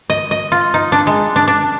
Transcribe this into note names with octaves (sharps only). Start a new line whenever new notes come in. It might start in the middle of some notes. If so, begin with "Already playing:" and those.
D#5
D#5
F4
D#4
D4
G#3
D4
D4